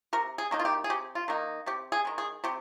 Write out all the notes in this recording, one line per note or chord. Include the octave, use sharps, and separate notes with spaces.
C3 A#4
G#4
D#3 A#3 D#4
F4
G4
G#4
C3 G4
F4
D#3 A#3 D#4
C3 G4
G#4
D#3 G#3
G#4
C3 G4